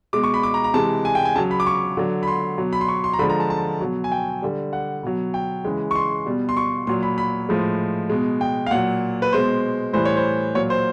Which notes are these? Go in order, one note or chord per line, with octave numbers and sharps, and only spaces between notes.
B2 G#3 D6
C#6
B5
D6
A#5
A#5
C3 E3 G#3 A5
G#5
G5
G#5
C#3 F#3 A5
B5
D6
C#6
D3 F#3
B5
C6
B2 F#3
B5
C6
C#6
C6
A#5
D3 F3 G#3 B5
A#5
A5
A5
B2 F#3
G#5
G5
D3 G3
F#5
B2 F#3
G5
C#3 E3 G#3
C#6
C6
B2 G3
C6
C#6
A#2 F#3 C6
B5
B5
A2 F3 G#3
B2 G#3
G5
F5
A#2 F#3 F#5
B4
B2 G#3 C5
A2 E3 G3 C5
C#5
C5
A#2 F#3 C#5
C5